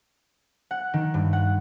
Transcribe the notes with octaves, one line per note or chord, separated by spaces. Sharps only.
F#5
D#3
G2
F#5